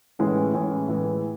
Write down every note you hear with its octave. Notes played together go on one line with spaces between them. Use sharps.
A2 E3 G#3 C#4
A2 E3 G#3 C#4
A2 E3 G#3